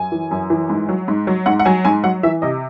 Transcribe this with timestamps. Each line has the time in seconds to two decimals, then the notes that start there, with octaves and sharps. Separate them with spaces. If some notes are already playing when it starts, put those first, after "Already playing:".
Already playing: F#2 G#5
0.12 E3
0.31 F#2
0.50 E3
0.70 G#2
0.89 F#3
1.08 G#2
1.27 F#3
1.46 G#2 F#5
1.59 F#5
1.65 F#3 G#5
1.85 G#2 G#5
2.04 F#3 F#5
2.23 E3 E5
2.42 C3 D#5